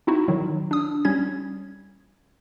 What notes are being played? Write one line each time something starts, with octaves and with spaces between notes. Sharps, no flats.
C4 D#4 E4 F#4
D#3 F#3
D4 D#6
G3 C#4 G#6